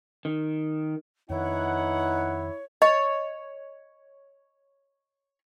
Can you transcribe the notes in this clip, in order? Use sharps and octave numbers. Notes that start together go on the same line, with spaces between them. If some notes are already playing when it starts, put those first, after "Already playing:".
D#3
F2 D#3 B3 D#4 E4 C#5 F#5
C#5 D#5